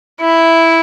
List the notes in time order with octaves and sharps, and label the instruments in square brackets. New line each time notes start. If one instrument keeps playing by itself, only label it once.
[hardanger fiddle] E4